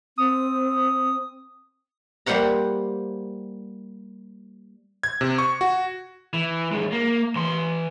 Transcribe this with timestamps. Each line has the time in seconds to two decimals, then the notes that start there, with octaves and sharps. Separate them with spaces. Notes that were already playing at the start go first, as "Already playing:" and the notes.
0.18 C4 D#6
2.26 G3 A#3 C5 F#5 A#5
5.03 G#6
5.21 C3
5.38 C#6
5.61 F#4
6.33 E3
6.72 F#2 G#3
6.92 A#3
7.36 E3 C6